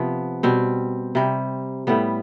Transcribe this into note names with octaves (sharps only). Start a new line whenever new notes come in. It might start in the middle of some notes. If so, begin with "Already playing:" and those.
Already playing: C3 F3 B3
B2 G3 C4
C3 G3
A2 G3 B3